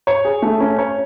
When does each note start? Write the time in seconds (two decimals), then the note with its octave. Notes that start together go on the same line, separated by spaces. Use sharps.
0.07 C#5
0.25 G#4
0.42 A3
0.60 C#4
0.78 C#5